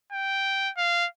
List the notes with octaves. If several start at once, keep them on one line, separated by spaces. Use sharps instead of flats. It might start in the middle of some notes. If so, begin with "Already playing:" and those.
G5
F5